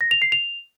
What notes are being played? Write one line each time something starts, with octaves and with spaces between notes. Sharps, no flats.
A#6
F7
C7
F7